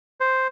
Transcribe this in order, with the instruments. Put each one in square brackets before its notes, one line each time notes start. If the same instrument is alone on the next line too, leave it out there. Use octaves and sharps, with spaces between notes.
[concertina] C5